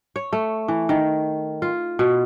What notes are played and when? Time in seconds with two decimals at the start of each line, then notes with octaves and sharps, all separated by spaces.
0.16 C#5
0.33 A3
0.68 E3
0.89 D#3
1.62 F4
1.99 B2